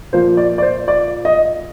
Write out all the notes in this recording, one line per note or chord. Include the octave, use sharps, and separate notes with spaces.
A#2 F3 A#3 C5
D5
D5
C5
D5
D#5